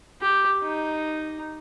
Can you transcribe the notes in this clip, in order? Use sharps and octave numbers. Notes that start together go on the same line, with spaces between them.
G4
D#4